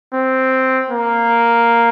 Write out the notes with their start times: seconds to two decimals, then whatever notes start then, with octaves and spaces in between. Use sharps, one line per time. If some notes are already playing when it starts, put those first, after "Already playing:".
0.14 C4
0.91 A#3